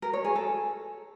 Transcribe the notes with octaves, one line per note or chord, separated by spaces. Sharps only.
A#4
C#5
G#4
A4